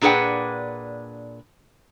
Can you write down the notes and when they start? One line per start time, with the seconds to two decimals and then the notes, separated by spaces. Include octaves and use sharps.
0.01 A#2 D4 G#4 B4 F#5 G5